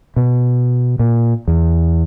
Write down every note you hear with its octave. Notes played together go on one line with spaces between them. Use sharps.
B2
A#2
E2